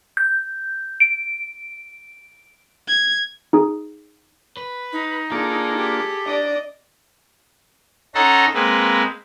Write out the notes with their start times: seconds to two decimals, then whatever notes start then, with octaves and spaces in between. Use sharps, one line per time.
0.17 G6
1.00 D7
2.87 G#6
3.53 D#4 G#4
4.57 B4
4.93 D#4
5.31 A#3 D4 F4 G#4 A4
5.77 G4
6.26 D4 D5 D#5
8.15 C#4 D#4 A4 F#5 A#5 C6
8.54 G#3 A#3 C4 B4